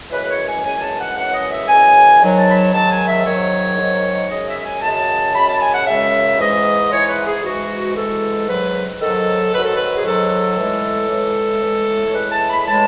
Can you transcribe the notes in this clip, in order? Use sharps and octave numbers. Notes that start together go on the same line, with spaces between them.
F#2 C#3 E3 G#3 B4
C#5
G#5
F#2 C#3 E3 G#3 G#5
A5
F#5
F#2 C#3 E3 G#3 F#5
D#5
E5
F#2 C#3 E3 G#3 G#5
G#2 D#3 F#3
A5
B5
A5
G#2 D#3 F#3 A5
G#5
E5
G#2 D#3 F#3 C#5
G#2 D#3 F#3
F#2 C#3 G#3 D#5
E5
G#5
F#2 C#3 G#3 A5
F#2 C#3 G#3 B5
A5
G#5
F#5
F#2 C#3 G#3 E5
G#2 E3 G#3 D#5
G#2 E3 G#3 C#5
B4
G#4
G#2 E3 G#3 F#4
G#2 E3 G#3 A4
G#2 D#3 F#3 B4
G#2 D#3 F#3 A4
G#2 D#3 F#3 B4
A4
B4
G#4
G#2 D#3 F#3 A4
A2 E3 G#3
A2 E3 G#3
A2 E3 G#3
C#5
A2 E3 G#3 B4
A5
B5
A2 E3 G#3 A5